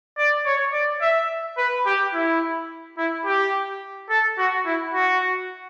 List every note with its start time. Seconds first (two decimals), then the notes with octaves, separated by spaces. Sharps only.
0.18 D5
0.46 C#5
0.73 D5
1.01 E5
1.58 B4
1.86 G4
2.14 E4
2.98 E4
3.25 G4
4.10 A4
4.38 F#4
4.66 E4
4.94 F#4